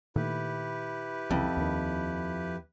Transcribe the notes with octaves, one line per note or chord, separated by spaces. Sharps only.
A#2 D#3 A3 E4 G4 B4
C2 F2 C#3 E3
D#2 D#3